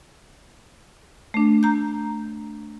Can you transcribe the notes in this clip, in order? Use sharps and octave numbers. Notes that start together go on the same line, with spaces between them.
A3 D4
A#5 G6